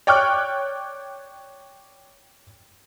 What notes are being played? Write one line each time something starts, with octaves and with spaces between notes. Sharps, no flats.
C#5 D5 G5 C#6 F6 F#6